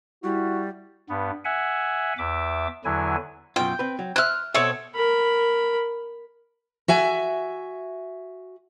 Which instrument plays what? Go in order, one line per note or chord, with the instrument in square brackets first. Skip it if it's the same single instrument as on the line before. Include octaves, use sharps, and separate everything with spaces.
[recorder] G3 [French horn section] E4 [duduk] F#4
[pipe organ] G2 B3
E5 F#5 G#5
E2 E5 D6
E2 D3 F#3 E4 G#5
[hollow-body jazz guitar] F#2 B2 F4 [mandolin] G5
[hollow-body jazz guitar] C4 B4
F#3
[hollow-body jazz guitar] C5 E5 [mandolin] F6 F#6
[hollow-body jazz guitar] B2 E5 [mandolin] C4 A4 C#5
[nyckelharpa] A#4 B5
[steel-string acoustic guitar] F#4 E5 G#5